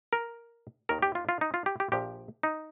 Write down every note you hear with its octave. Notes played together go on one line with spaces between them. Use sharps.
A#4
D#2 D#3 A#4
G4
F4
F4
D#4
F4
G4
G4
A#1 A#2 F3 G4
D#4